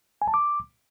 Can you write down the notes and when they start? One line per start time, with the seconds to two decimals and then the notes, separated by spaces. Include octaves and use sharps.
0.22 G#5
0.28 A5
0.34 D6